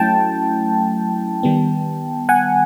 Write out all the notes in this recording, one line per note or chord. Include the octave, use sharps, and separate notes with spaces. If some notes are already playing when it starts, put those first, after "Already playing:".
Already playing: F#3 A3 C#4 E4 G5 A5
D#3 G3 B3
F#5 G#5